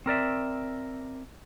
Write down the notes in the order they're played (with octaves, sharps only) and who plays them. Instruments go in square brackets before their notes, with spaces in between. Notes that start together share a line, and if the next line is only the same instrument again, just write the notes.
[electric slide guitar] C4 A#4 D5 E5